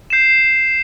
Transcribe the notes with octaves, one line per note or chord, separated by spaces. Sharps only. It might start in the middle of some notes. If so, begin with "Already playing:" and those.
G6 C7 E7